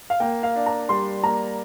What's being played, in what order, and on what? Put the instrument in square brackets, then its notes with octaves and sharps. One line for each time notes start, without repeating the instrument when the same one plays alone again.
[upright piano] F5
[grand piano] A#3 [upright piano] G5
[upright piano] F5
[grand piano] D4
[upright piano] A#5
[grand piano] G3 [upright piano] C6
[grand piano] A#3 [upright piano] A#5